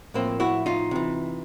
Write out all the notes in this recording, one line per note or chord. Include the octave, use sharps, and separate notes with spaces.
A2 F3 A#3 C4
E4 F#4
D#4 F4
C3 E3